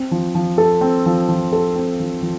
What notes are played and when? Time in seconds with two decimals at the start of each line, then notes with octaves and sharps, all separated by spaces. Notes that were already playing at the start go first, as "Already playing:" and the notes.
Already playing: C4
0.11 F3
0.35 F3
0.58 A4
0.81 C4
1.06 F3
1.29 F3
1.53 A4
1.76 C4
2.00 F3
2.22 F3